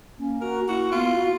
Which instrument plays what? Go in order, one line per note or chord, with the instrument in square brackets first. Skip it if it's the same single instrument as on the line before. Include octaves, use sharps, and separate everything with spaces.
[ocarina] A#3 [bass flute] C#4
[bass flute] F#4 [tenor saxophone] A#4
[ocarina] A#3 [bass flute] E4 [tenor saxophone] F#4
[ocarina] B3 [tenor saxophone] F4
[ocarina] F#4